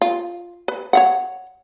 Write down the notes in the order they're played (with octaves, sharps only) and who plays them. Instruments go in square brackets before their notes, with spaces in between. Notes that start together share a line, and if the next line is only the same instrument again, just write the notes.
[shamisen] F4
B4
C#5 F5 F#5